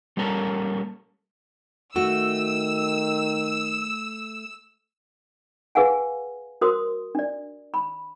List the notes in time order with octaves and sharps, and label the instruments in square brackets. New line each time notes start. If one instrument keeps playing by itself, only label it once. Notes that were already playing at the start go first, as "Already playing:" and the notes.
[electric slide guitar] G3 A#3 C#4 A4 A#4
[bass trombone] D#3 [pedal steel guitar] A3 [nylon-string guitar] F#4 [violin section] E6
[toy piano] G#4 B4 F5 F#5 G#5
F#4 A#4 C5 C6 D#6
D4 D5
B5